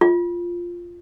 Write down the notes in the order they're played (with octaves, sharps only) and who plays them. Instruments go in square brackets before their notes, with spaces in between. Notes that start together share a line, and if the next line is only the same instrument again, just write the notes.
[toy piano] F4